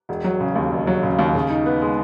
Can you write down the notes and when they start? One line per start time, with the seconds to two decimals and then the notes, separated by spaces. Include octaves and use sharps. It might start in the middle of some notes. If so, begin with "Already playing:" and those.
0.09 E1
0.24 F#3
0.40 C#3
0.55 D#2
0.71 E1
0.87 F#3
1.03 C#3
1.19 D#2
1.35 C#3
1.50 D#4
1.66 B3
1.82 G#3